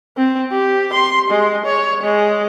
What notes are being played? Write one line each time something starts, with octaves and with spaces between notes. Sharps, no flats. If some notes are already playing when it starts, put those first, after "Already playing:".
C4
G4
C6
G#3
C#5
G#3